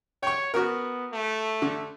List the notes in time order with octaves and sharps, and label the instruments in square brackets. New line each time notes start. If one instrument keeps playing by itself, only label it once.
[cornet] C#5 [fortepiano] G5 C#6
[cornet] B3 [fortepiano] F#4 A#4
[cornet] A3
[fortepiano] D3